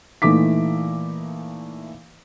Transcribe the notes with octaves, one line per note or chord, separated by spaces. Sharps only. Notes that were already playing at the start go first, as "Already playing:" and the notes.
A#2 E3 A3 D#4 D6 B6